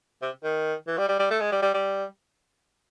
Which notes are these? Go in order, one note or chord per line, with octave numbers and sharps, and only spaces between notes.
C3
D#3
E3
G3
G3
G3
A3
G#3
G3
G3
G3